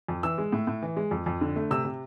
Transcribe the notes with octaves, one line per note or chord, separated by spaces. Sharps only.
F2
E3 E6
G#3
A2
A2
E3
G#3
F2
F2
D3
A3
C3 E6
C3